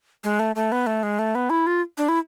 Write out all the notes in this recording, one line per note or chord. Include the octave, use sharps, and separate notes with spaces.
G#3
A3
A3
B3
A3
G#3
A3
B3
E4
F4
D4
E4